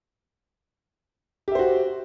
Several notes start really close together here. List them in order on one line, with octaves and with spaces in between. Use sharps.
G4 E5 C5 F#4